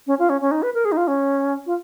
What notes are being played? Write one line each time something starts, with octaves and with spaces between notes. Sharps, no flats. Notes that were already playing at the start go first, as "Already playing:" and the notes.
C#4
F4
C#4
C#4
D#4
B4
A#4
G#4
D#4
F4
C#4
F4